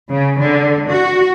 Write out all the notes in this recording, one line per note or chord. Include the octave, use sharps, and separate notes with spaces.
C#3
D3
F#4